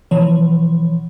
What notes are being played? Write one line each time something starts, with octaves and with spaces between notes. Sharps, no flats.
B2 E3 F3 C#5